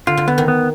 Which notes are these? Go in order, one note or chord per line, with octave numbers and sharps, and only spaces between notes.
D3 F4
D3
D3 B3
D#3
B3